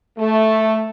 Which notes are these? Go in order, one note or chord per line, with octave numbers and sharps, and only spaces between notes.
A3